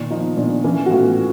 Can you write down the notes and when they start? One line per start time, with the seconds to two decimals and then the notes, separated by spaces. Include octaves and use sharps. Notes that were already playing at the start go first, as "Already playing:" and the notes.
Already playing: A#2 D#3
0.10 F3 D#4
0.37 A#2 D4
0.64 E3 C#4
0.86 F#4
0.91 A2 F4